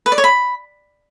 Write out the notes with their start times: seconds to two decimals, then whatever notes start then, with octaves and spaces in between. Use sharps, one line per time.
0.06 B4
0.12 D5
0.18 C#5
0.24 B5